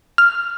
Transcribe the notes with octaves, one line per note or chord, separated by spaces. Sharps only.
F6